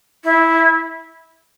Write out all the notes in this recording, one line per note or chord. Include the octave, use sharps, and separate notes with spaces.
E4